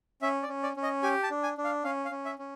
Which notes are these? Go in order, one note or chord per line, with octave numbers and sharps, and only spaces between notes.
C#4 E5
D5
C#4
D5
C#4
D#5
G4 G#5
A5
D4
G#5
D4
F5
C#4 F5
F5
C#4
E5
C#4